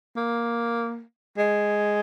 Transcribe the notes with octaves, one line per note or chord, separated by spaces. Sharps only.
A#3
G#3